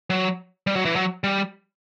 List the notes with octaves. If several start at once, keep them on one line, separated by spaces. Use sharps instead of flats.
F#3
G3
F#3
E3
F#3
G3